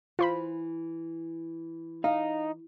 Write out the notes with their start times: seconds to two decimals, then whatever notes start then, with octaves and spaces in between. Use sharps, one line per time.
0.19 E3 F4 C5 B5
2.04 D#4 F5